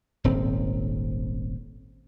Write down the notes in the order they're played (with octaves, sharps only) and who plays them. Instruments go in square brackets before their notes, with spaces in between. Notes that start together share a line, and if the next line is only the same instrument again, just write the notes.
[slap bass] D#1 G#1 C4